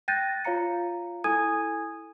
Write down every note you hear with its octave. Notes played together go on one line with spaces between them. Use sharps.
G5 F#6 G6 A6 A#6 D#7
F4 C#5 F5 A#5 C#7
E4 A4 G#5 D#6 G#6 D#7